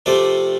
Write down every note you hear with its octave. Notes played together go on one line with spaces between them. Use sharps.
C3 F3 A3 C4 D5